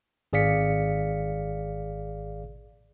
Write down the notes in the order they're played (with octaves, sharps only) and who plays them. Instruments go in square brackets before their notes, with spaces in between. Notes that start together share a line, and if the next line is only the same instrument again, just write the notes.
[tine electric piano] G#1 G#4 D5 F5 B6 C#7